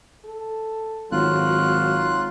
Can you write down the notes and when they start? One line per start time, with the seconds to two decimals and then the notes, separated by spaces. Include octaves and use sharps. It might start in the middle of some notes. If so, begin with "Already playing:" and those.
0.25 A4
1.12 G#1 F#3 F4 F#6